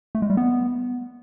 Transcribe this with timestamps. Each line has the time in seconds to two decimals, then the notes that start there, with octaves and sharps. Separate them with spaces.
0.15 A3
0.22 G#3
0.30 G3
0.37 B3